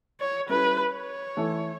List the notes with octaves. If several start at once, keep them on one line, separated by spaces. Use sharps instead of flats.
C#5
G3 C#4 E4 A4 B4
C#5
E3 A3 E4 A4